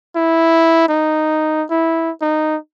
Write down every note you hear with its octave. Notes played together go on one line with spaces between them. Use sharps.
E4
D#4
E4
D#4